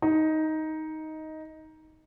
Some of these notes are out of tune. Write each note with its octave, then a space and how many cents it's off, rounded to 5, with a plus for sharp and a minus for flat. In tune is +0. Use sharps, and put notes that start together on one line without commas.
D#4 +10